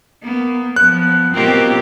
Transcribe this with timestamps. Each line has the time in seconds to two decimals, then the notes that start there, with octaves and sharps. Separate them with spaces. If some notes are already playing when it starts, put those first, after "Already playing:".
0.23 A#3 B3
0.76 F3 B3 F#6
1.34 B2 A#3 C4 F4 G4